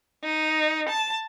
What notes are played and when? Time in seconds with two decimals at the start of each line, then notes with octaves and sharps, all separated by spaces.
0.23 D#4
0.89 A5